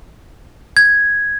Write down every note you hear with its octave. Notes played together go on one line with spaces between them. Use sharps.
G#6